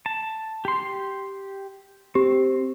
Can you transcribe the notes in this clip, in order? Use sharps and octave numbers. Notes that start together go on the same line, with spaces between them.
A5
G4 C6
C4 G4